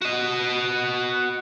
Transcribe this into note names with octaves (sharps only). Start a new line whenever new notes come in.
F#4 D#5